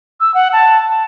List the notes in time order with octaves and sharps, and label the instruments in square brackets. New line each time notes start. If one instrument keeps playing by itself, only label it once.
[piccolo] E6
F#5
A5
A5